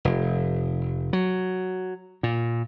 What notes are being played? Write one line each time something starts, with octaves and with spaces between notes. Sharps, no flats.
F1
F#3
A#2